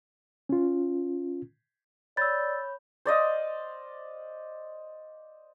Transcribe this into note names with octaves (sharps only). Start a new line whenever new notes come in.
C#4 F4
C#5 D5 B5 E6 G6 A6
C5 D5 D#5 F5